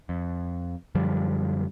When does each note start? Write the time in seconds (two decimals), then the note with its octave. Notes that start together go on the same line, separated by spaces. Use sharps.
0.09 F2
0.95 F#2 D3 F3 G3